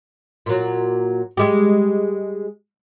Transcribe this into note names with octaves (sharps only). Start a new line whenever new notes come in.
A#2 F#3
G3 G#3 G4